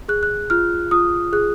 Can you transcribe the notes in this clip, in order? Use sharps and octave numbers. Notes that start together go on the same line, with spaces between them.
G#4 F#6
F#6
F4 F6
F4 D#6
G#4 F#6